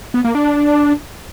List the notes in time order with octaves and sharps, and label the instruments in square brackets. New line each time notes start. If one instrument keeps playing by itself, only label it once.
[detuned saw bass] B3
A#3
D4